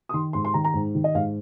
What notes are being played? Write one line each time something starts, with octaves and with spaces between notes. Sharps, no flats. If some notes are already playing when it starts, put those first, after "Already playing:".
D#6
D#3 C6
G#2 C6
C6
D#3 A#5
A#5
G#2
D#3
D#5
G#2 F5